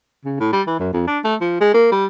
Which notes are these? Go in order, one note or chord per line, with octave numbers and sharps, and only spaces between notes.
C#3
A2
G3
E3
F#2
F2
D4
A3
F3
G#3
A#3
G3